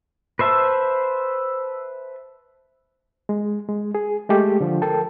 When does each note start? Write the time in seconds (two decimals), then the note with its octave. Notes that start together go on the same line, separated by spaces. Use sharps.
0.39 B4 C5 E5 A5
3.29 G#3
3.69 G#3
3.95 G#4
4.30 G#3 A3 G4
4.61 D3 F3
4.82 A4 A#4 G5 A5